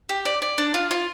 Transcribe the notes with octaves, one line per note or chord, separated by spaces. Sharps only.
G4
D5
D5
D4
F4
F4